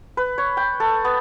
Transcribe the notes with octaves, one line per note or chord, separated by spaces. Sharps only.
B4
C#5
G5
A4
B3